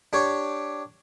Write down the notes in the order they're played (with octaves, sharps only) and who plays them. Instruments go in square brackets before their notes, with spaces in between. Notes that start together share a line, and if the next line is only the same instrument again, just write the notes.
[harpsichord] D4 G4 C#5